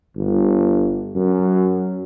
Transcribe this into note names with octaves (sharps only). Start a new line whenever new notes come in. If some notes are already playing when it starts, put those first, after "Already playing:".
G1
F#2